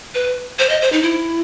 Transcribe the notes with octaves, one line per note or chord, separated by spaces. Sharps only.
B4
C5
D#5
C5
D#4
E4